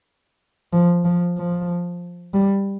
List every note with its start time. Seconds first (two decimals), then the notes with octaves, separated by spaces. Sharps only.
0.73 F3
1.05 F3
1.37 F3
2.34 G3